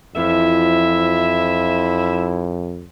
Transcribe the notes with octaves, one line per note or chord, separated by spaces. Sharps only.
F2 E3 F3 E4 E5